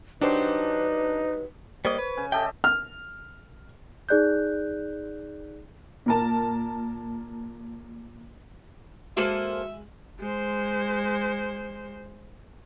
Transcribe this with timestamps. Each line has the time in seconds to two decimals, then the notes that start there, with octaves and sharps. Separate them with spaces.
0.21 F#3 D4 D#4 G4 B4 C5
1.85 G3 A#3 C5 C#5 D#5 D6
1.98 B4
2.17 C#3 G#5
2.32 G4 A4 D#5 E5 G5 A5
2.64 F6
4.09 D#4 G#4 D5 F#6 G6
6.06 A#2 A#4 A5
9.17 G#3 A#3 F#4 A4 C5 E5 D#7 F#7
10.19 G#3 C5